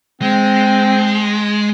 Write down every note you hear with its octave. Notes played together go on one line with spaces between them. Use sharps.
G#3 C4